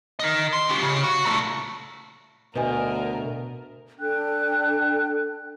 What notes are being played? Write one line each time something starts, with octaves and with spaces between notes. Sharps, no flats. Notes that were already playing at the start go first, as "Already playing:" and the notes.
A#4 D#5
C6
C#4 G4
C#3
F#4
A#2 A3
D2 B2 A#4 B4 D#5 G#5
D4 A4 G5 F#6